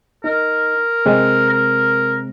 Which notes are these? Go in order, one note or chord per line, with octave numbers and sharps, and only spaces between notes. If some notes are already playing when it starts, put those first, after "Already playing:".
D#4 A#4
C3 G#3 C4
A#4